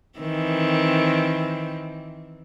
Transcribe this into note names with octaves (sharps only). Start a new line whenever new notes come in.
D#3 E3 C4